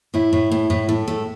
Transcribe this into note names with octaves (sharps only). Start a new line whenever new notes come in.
A2 E4
A2
A2
A2
A2
A3